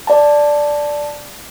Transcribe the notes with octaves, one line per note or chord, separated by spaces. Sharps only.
D5 A5